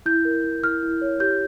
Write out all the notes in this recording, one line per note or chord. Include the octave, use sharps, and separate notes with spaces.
E4 G6
A#4
E4
E4 F6
E4
C#5
G4 G6